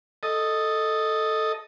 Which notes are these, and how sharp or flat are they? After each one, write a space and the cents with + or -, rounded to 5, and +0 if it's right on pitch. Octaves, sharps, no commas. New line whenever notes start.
A4 +0 D#5 +0